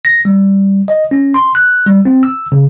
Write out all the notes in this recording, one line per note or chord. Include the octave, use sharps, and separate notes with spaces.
A#6
G3
D#5
C#4
C6
F#6
G3
C4
E6
C#3